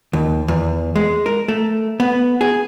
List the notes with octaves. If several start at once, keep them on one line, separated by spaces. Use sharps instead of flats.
D#2
E2
G#3
A#4
A3
B3
G#4